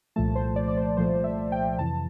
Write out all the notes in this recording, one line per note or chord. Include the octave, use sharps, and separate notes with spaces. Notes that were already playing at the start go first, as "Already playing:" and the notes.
C2 A#2 F3 A3 A5
C5
D5
D5
C5
C2 A#2 F3 A3 C5
E5
G5
F2 C3 E3 A5